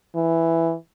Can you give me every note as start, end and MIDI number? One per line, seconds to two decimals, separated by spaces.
0.16 0.74 52